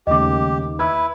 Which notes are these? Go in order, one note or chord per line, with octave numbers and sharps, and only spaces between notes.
D#2 C#3 G3 A3 G4 D#5 D6
E4 B4 B5 E6 G#6